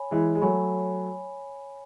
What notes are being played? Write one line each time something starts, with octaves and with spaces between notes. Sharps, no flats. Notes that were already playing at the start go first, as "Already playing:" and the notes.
Already playing: C#5 G#5 B5
E3 G#3
G#3
F#3 A3 C#5 G#5 B5